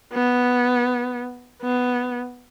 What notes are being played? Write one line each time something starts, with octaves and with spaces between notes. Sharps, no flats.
B3
B3